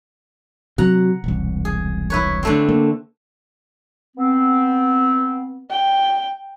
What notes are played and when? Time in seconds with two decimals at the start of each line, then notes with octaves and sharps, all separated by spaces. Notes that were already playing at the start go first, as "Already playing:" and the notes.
0.78 C3 F#3 F#5 A#5
1.24 E1 C2
1.65 G#4
2.10 E4 B4 C#5
2.43 D3 A3 C4
2.69 A#3
4.16 B3 C4
5.71 G5